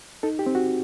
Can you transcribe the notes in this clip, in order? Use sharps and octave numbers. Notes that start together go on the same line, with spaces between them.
D#4 A4
G4
C4
F#4